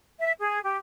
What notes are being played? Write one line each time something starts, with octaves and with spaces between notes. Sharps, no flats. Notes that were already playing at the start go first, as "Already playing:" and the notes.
E5
G#4
G4